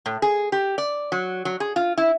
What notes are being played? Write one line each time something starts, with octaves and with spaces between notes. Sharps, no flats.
A2
G#4
G4
D5
F#3
F#3
G#4
F4
E4